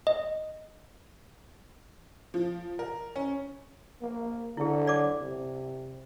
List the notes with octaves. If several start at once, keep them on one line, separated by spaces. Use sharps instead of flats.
D#5
F3
A#4
C#4
A#3
D3 E4 G#4
D5 D6
C3